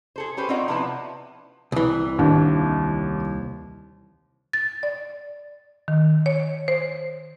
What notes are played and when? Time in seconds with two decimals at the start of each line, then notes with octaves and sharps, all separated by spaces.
0.16 G#4 A4 C5
0.37 C#4 G4 B4 C5
0.49 C4 C#4 D#4 F4 D5 F#5
0.68 C3 F3 B3 E4 B4 A5
1.72 C2 E3
2.19 D#2 D4
4.53 A6
4.83 D5
5.88 D#3
6.26 C#5
6.68 C5